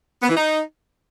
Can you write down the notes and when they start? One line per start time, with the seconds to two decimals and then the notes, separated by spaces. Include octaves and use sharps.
0.22 B3
0.29 E3
0.36 D#4